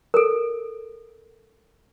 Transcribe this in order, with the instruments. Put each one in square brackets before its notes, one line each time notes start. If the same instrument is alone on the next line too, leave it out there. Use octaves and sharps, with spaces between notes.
[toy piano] A4 A#4